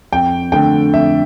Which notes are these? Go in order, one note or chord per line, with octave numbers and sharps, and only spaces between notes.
F2 G5
D3 A3 G5
F2 E5